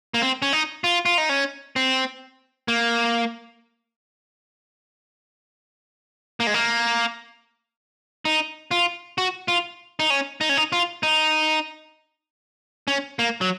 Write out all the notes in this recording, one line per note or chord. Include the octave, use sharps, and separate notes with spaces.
A#3
C4
C#4
D#4
F4
F4
D#4
C#4
C4
A#3
A#3
G#3
A#3
D#4
F4
F#4
F4
D#4
C#4
D#4
C#4
D#4
F4
D#4
C#4
A#3
F#3